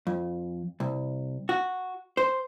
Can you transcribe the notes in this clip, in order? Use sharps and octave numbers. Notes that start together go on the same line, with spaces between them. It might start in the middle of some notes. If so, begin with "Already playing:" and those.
F2
C2
F#4
C5